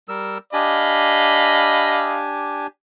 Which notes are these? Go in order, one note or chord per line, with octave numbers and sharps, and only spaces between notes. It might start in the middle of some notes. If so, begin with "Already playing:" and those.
G3 A#4 E6
D4 G4 D#5 F5 G#5 B5